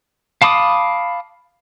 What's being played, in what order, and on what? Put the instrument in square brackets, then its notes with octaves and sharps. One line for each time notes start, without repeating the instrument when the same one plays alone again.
[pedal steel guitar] F5 A5 B5 D6 D#6